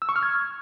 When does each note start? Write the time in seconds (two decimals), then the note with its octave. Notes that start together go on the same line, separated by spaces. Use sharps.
0.02 E6
0.09 C#6
0.16 F6
0.23 G#6